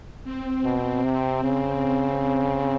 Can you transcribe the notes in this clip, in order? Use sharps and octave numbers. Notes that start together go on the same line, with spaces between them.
C4
B2
C3
C#3